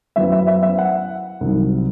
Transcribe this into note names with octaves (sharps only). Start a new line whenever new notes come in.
F#2 F#3 B3 E4 E5
E5
E5
E5
F#5
C2 C3 D#3 F#3